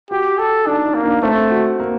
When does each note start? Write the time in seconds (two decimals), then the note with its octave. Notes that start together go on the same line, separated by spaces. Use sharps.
0.11 F#4 G4
0.39 A4
0.67 D4 D#4
0.85 D#4
0.94 A#3
1.04 D4
1.22 A3 C4
1.51 F#4
1.80 A#3